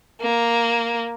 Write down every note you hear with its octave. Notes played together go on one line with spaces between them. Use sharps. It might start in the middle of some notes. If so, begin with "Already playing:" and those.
A#3